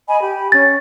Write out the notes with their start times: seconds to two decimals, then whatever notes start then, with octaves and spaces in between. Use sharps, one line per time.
0.09 D#5 G#5 B5
0.21 G4 B5
0.52 C#4 A6